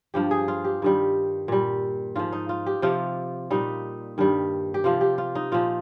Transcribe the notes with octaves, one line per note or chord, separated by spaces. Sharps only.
G2 F3 G4
G#4
F4
G4
G2 D#3 G3
A#2 G3
G#2 F3 F4
D#4
F4
G4
C3 F3 F4
A#2 G3 D#4
G2 D#3 G3
G4
C3 F3 F4
G4
F4
D#4
A#2 F3 F4